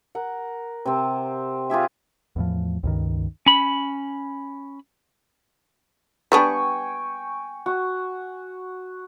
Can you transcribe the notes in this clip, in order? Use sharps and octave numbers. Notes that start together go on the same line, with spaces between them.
A#4 F#5
C3 C4
F4 G4 G#4 E5
E2 A2 F3
C#2 G2 D#3
C#4 B5
G3 B3 D4 G5 G#5 C#6
F#4